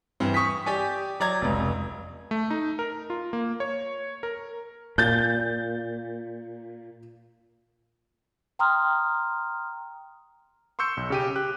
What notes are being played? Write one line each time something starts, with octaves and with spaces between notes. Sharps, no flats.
G2 E3 C4
C#6 D#6 B6
G4 D5 G#5
F#3 D5 A#5 G#6
F1 C#2
A3
D#4
A#4
F4
A#3
C#5
A#4
A#2 G6 A6
G5 A#5 C6 D#6 F6
C6 C#6 E6 G6 C#7
B1
C#3 G4 D#7
G4 F#6